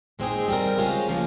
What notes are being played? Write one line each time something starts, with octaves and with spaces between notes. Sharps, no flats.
A#2 G#3 C4 D#4 G#4
G3 C4 D#4 A#4
C#3 G#3 C#4 F4 C5
C#3 F3 A#3